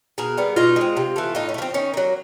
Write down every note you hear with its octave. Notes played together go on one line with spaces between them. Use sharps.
B2 G#4 A#4
G3 B3
B2 D#4 F4
G#3 C4
C3
E3 A3
A2 D#4 F4
C#4
A3
F3 C4
D#3 C#4
F#3 A#3